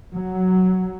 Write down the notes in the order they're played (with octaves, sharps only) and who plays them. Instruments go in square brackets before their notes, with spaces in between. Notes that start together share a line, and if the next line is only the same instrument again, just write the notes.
[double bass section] F#3